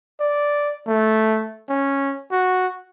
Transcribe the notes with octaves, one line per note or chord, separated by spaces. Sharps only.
D5
A3
C#4
F#4